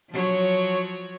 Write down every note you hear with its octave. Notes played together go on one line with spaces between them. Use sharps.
F3 F#3 C#5